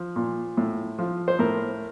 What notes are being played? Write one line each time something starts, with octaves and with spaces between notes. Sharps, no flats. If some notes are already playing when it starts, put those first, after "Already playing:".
Already playing: F3
A#2
A2
F3
C5
A2 A#4